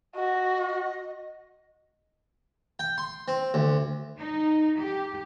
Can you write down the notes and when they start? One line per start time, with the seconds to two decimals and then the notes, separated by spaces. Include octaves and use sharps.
0.15 F#4 D#5
2.79 G5
2.98 C6
3.28 C4
3.54 D2
4.18 D#4
4.79 G4